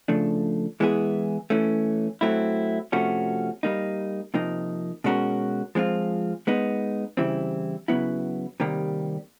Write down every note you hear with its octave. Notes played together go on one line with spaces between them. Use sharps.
C#3 F3 A3 D4
E3 G#3 B3 E4 G#4
E3 A3 C#4
F#3 A3 C4 E4
C3 F3 A3 C#4 F#4
G3 A#3 D#4
C3 F3 A#3 D#4
B2 G#3 C#4 F#4 A#4
F3 G#3 C4 F4
G#3 B3 D#4
C#3 E3 G3 C4 E4
C#3 F#3 B3 E4
C3 D#3 G3 A#3